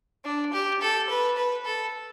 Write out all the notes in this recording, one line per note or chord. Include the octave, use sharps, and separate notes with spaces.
D4
G4
A4
B4
B4
A4